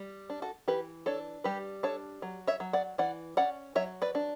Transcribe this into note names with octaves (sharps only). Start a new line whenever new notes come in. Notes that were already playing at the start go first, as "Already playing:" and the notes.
Already playing: G3
D4
F#4 A4
E3 G4 B4
D4 A4 C#5
G3 G4 B4
D4 A4 C#5
F#3
C#5 E5
F#3
D5 F#5
E3 D5 F#5
C#4 D5 F#5
F#3 C#5 E5
B4 D5
D4